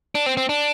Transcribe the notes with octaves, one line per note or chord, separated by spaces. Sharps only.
D4
C4
C4
D4